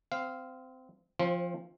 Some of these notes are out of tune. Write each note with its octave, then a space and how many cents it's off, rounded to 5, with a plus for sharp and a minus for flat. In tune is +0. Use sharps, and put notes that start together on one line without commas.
C4 -20 F5 +0
F3 +0 C4 +30 F4 +0